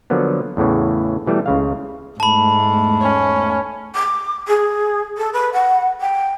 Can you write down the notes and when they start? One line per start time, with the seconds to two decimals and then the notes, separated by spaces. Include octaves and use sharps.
0.10 D3 F3 F#3 A#3 B3
0.57 E2 A2 C#3 E3
1.26 B2 E3 G3 A3
1.46 C#2 C#3 F5
2.20 E2 G#2 A3 A5 B5
3.02 C#4
3.95 D6
4.47 G#4
5.18 A4
5.33 B4
5.53 F#5
6.01 G5